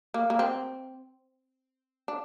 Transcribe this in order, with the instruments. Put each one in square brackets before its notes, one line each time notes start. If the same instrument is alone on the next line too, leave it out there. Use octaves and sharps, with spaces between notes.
[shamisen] A#3
A#3
C4
D4